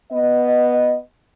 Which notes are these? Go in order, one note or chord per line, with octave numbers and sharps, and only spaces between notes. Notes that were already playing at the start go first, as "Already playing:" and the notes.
B3 D#5